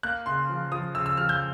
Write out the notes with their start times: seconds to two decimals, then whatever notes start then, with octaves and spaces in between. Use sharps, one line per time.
0.03 A#3 F#6
0.26 C#3 C6
0.50 F3
0.72 F3 D#6
0.95 C#3 E6
1.06 E6
1.17 F3 F6
1.29 G6